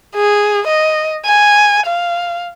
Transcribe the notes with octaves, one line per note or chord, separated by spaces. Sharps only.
G#4
D#5
G#5
F5